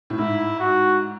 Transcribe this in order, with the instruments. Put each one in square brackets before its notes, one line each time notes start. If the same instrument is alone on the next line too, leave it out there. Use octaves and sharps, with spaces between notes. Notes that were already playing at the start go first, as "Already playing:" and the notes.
[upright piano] A2
[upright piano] G#2 [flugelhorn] E4
[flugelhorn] F#4